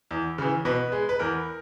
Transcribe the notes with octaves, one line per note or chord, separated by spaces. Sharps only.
E2
C#3 E3
B2 B4
G#3
B4
E2 A#4